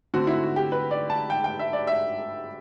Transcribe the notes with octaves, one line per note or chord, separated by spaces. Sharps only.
D3 A3 C4 F#4
E4
F#4
G4
B4
D5
A5
G5
G5
E5
D5
E5